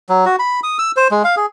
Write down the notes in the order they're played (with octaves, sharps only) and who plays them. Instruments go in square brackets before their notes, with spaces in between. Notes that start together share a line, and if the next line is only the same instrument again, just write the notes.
[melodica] F#3
F#4
B5
D#6
E6
C5
G#3
F5
G#4